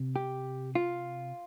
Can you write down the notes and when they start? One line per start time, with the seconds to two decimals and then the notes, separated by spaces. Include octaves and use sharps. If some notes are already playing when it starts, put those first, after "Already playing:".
Already playing: C3
0.16 G4
0.75 F4